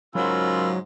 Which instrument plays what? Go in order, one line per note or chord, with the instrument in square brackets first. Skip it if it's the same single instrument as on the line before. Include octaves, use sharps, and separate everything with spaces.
[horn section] G#2 C#3 F4 [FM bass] F#3 [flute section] A#4 B5 E6